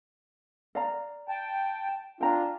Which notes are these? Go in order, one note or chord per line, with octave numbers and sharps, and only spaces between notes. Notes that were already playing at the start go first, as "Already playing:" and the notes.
D5 F5 A#5
G5 A5
D4 F4 G5 A#5